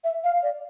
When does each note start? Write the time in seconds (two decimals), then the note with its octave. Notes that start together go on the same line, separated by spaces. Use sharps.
0.04 E5
0.23 F5
0.42 D5